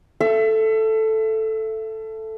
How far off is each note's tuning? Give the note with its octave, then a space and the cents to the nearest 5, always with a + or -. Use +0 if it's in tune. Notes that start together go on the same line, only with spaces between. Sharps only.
A4 +0 E5 +30